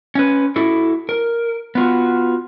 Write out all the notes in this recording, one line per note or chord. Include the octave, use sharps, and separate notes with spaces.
C#4 B4
E4 F#4 A4
A#4
B3 F4 F#4